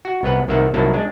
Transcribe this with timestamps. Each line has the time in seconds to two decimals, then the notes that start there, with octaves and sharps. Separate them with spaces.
0.05 F#4
0.23 C2 B3 B4 F#5
0.48 C2 D#3 A#3 E5 F#5
0.74 C2 D#3 F#3 A#3 E4 A5
0.93 G#3 D4